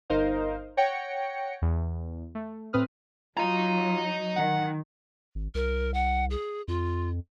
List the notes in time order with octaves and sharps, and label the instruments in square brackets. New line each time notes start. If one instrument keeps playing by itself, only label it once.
[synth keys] G1 D#4 A#4 C5 D#5 F5
C#5 F#5 G5 A#6 C#7
E2
A3
A2 C4 B4 D#6 F6
[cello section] F#3 [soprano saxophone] F4 [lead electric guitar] D#5 A#5
[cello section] D#3 [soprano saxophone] F#5
[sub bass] G#1
[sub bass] C2 [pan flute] A#4
[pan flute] F#5
G#4
[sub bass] F2 [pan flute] F4